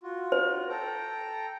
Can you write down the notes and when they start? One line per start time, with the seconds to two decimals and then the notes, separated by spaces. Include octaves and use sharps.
0.03 F4 F#4
0.32 C5
0.69 A4 G5 A#5